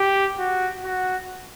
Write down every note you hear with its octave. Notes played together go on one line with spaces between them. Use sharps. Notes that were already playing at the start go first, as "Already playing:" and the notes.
Already playing: G4
F#4
F#4